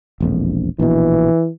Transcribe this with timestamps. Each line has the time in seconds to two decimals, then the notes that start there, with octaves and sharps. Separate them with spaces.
0.20 E1 A#1 F2
0.79 A#1 B2 E3